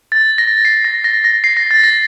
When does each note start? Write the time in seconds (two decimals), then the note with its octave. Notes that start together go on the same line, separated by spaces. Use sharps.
0.12 A6
0.38 A#6
0.65 C7
0.85 A#6
1.04 A#6
1.24 A#6
1.44 C7
1.57 A#6
1.71 A6
1.84 A#6